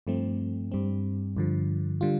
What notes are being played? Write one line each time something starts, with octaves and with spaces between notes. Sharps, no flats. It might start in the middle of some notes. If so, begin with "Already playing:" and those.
G2 F3 A3 C4
G2 G3 C4
G2 D3 F3
D3 G3 F4